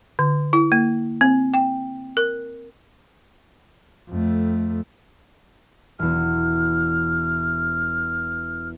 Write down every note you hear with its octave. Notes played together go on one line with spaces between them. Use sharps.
D3
E4
A#3
C4
G5
A#4
F2 A3
E1 E2 F6